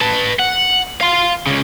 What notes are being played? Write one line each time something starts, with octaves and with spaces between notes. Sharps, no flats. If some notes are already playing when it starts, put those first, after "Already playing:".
B4 A5
F#5
F5 C6
C#2 C#3